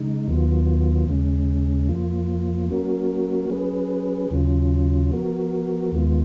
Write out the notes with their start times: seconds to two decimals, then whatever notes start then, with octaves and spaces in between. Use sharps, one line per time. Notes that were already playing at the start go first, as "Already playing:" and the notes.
Already playing: C#3 G#3 D#4
0.28 D#2 D#3 F#3 B3 F4
1.08 D#2 C#3 G#3 C#4
1.89 F2 F3 A#3 F4
2.69 F#3 A#3 C#4 F#4 A#4
3.50 F#3 C#4 G#4 B4
4.31 D#2 C#3 F#3 C#4 F4
5.11 F3 B3 F#4 A#4
5.92 D#2 D#3 G#3 B3 F4